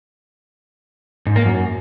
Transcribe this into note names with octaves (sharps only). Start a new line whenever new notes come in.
G#2
A#3
F#2